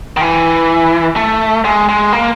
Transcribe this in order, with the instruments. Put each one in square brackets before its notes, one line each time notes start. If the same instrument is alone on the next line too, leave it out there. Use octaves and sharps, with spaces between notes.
[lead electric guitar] D#3
E3
A3
G#3
G#3
A#3